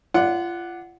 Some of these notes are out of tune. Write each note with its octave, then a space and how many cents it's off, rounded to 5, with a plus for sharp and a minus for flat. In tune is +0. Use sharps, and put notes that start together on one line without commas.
F4 -30 D5 +0 F#5 +0